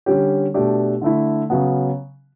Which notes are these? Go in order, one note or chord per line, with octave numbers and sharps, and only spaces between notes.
D3 G3 C#4 G4
B2 A3 D4 G4
D3 A3 E4
C#3 F#3 B3